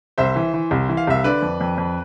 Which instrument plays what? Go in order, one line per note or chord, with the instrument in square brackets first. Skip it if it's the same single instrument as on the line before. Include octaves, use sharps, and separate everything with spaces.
[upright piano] C2 [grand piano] C5 E5
[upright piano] E3
E3
C2
E3
[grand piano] F5
[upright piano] C2 [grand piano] E5
[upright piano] D3 [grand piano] B4 D5
[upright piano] F2
F2
F2